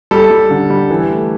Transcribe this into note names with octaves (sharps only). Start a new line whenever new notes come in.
G3 A4
G3
D3
G3
E3
A3